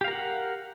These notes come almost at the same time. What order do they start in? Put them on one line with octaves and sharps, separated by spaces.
G4 F5 A#4 F#5